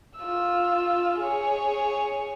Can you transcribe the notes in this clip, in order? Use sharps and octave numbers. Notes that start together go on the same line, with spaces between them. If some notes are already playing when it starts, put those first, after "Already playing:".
F4 E6
G#4 C#5